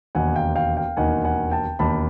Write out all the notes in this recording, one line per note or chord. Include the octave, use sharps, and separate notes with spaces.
E1 D#2 D#3 F#5 G#5
F5 G5
F5 G5
F5 G5
E1 D#2 D#3 F#5 G#5
F#5 G#5
G5 A5
E1 D#2 D#3 A5 B5